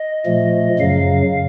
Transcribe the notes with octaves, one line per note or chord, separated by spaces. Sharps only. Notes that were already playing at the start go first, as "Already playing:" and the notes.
Already playing: D#5
A#2 F3 A3
F#2 C#3 F#3 F5